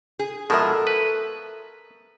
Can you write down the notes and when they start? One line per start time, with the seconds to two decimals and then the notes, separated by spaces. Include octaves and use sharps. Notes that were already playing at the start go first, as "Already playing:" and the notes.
0.19 G#4
0.50 B2 F3 G#3 A4 A#4 E5
0.87 B4